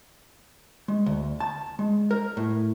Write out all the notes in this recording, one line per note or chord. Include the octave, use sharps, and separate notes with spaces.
G#3
D2
A5
G#3
A#4
A2